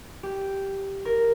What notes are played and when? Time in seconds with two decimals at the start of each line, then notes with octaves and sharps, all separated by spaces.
0.23 G4
1.05 A#4